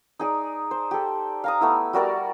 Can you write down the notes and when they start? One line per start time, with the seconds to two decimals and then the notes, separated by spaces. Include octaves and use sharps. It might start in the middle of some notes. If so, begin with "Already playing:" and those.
0.19 D#4 G#4 D5
0.71 C5
0.91 G4 A4
1.44 F5 A#5 D#6
1.61 A3 B3 E4
1.93 G3 F#4 A#4 D5